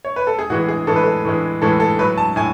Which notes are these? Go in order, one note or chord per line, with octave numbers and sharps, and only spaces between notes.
C#5
B4
A4
G#4
A2 E3 G#3 F#4
G#4
A2 E3 G#3 A4
B4
A4
A2 E3 G#3
A2 E3 G#3 A4
A4
A2 F#3 B4
A5
A2 G#5